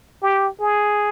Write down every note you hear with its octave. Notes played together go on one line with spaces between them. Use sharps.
G4
G#4